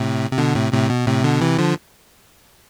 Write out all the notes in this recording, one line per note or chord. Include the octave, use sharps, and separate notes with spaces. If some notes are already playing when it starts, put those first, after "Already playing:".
Already playing: A2 C3
C3
B2 D3
A2 C3
A2 C3
B2
A2 C3
B2 D3
C3 E3
D3 F3